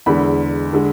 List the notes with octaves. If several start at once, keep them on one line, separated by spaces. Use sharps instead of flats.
E2 D3 G#3 B5
D3 G#3